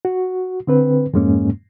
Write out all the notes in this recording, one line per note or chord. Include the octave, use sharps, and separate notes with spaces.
F#4
D3 C4 B4
F2 G#2 G#3 A#3 C#4